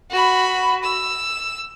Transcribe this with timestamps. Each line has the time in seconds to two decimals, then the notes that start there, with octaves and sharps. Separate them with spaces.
0.11 F#4 B5
0.83 E6